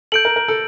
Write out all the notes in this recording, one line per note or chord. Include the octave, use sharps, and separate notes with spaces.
A4 G6 D7 F#7
A#4
A#4
A4